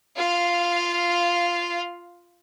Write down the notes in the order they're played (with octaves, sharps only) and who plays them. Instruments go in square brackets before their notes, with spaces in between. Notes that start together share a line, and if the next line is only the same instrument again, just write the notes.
[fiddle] F4 F5